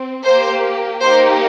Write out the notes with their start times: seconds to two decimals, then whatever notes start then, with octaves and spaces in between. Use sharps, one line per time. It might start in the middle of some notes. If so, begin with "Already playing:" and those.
Already playing: C4
0.26 A#3 G4 C5
1.03 A#3 D#4 G4 C5